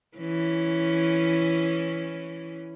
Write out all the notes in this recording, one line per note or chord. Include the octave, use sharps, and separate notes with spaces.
E3 C#4